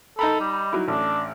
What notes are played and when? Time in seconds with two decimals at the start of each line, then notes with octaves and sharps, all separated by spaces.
0.19 D#4 A4 A#5 B5
0.41 G3
0.73 F#3 D#4 E4
0.88 A1 D4